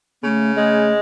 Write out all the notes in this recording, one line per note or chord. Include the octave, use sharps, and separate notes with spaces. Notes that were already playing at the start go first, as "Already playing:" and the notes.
C#3 A3 B3
G#3 A3